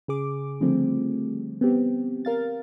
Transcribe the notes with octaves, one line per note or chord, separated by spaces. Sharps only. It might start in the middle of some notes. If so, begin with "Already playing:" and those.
C#3 G#4 D6
D3 F3 G3 A3 C4
B3 C4 G4
A#4 F5 A6